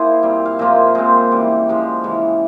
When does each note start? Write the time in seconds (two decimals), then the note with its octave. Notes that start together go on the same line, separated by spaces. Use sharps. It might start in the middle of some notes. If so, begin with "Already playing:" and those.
Already playing: A#3 E4 G#4 C5
0.23 A#2 G3 C4
0.46 F5
0.59 A#2 F3 A#3 F4 C5 E5
0.95 A#2 G#3 C4 G#4 C5
1.31 C#3 E3 G3
1.68 C3 F3 G#3
2.04 C#3 E3 G#3